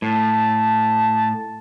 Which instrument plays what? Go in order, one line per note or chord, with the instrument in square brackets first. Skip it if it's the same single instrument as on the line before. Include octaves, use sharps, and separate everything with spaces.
[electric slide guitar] A2 [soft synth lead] A5